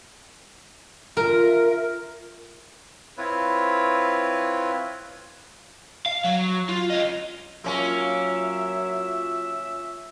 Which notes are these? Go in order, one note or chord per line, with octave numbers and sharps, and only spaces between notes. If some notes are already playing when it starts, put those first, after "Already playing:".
F4 A#4 E5
C4 E4 F4 B4 C#5
F5
F#3
F4
C#4 D#5
F#3 A#3 C#4 F4 A#4 E5